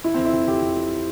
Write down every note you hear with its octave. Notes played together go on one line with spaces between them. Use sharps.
E3 E4
F2 C4
E4
F2
F2 G4
F2
E3